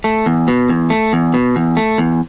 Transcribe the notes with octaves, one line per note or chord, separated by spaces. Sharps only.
A3
E2
B2
E2
A3
E2
B2
E2
A3
E2